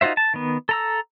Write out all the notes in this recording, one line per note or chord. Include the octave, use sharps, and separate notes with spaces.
D#4 F4 F#4 C5 E5
A5
D#3 B3
A4 A#5 E6